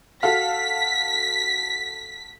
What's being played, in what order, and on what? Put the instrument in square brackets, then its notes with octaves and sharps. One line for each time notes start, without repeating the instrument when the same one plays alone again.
[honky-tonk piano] F#4 A4 F5 [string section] B6